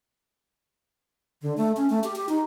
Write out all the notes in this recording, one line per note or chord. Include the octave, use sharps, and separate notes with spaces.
D3
A3
C#4
A3
G4
G4
D#4